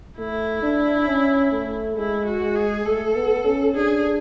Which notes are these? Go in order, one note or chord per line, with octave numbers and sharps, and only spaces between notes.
A3 E4
D4
C#4
A3
G#3 E4
F#4
G#3
G#4
A3 A4
B3
C#4
D4 G#4